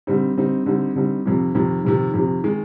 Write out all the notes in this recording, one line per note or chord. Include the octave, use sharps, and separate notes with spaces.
D3 G3 C4 D#4
D3 G3 C4 D#4
D3 G3 C4 D#4
D3 G3 C4 D#4
F2 C3 D#3
F2 C3 D#3
F2 C3 D#3
F2 C3 D#3
D#3 G#3